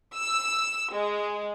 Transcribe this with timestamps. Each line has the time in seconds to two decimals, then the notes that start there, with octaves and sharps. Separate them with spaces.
0.18 E6
0.94 G#3